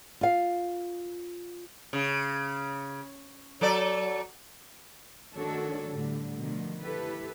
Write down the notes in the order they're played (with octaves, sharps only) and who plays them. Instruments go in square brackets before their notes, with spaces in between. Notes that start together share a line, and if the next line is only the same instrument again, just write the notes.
[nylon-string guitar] F4 F5
[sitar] C#3
F#3 A4 D5
[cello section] D#3 A3 D4 F#4 A4 C#5
A2 D3 G3
B2 D3 D#3 F3 A3
E4 G4 A4 B4